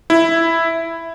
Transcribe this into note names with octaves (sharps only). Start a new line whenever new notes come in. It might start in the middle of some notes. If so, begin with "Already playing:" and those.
E4